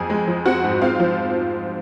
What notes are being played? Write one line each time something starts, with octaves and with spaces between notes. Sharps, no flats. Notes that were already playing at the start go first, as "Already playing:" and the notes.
Already playing: F2 G#4 G#5
G#3
F3
C4 F#4 F#5
G#2
C4 F4 F5
F3